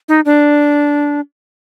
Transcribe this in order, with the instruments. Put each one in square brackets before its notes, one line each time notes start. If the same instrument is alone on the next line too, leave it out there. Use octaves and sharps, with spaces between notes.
[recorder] D#4
D4